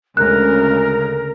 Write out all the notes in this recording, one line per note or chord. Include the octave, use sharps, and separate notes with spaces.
D2 C#3 G#3 A#4 F#6